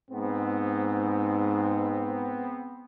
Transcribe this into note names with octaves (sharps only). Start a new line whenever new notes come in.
G#2 B3 C4